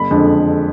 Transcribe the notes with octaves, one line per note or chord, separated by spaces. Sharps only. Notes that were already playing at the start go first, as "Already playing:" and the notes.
Already playing: F#1 B5
F2 D3 G#3 D4